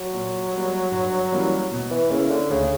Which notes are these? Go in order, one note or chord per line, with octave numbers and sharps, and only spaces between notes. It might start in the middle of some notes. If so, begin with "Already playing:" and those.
Already playing: F#3
A#2
G3 A#3
G2
E3 G3 A#3 C#4
B2
E3
C#3 A#3 C#4 E4
D3
D2 C#3